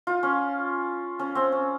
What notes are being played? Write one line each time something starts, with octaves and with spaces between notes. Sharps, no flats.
F4
C#4
C#4
C4
C#4